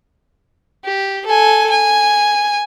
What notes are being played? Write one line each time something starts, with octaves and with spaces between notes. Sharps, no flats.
G4
A4 G#5
G#5